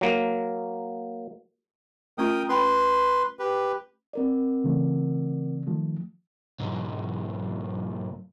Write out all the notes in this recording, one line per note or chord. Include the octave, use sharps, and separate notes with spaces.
F#3 A#3
A3 C#4 F4 A#4 G5 D#6
C#4 B4 G5 B5 C6
G4 B4
C4 A#4 D5
C#3 E3 A3
D#3 F3 A3
B1 G#2